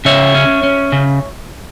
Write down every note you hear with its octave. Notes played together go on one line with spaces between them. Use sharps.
C#3 C#5 E5
C#4
C#4
C#3